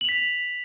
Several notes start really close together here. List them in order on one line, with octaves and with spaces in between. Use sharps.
F#7 F7 B6